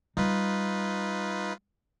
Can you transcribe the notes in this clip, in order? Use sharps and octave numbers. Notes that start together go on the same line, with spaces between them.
G3 D#4 F4 B4